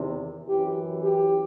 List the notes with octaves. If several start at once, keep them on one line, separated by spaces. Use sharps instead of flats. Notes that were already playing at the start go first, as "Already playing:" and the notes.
Already playing: E2 C3 D#3
F#2 E3 G4
G4